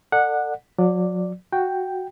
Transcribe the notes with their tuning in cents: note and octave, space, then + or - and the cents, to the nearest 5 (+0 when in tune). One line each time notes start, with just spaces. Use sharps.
A4 +30 D5 +30 F#5 -10
F#3 -35 D5 +0
F#4 +0 G5 +0